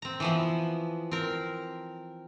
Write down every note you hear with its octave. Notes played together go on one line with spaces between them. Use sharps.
C4 A#5
E3 F3 B3
C4 A#4